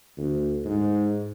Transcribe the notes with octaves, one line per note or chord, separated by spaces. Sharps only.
D2
G#2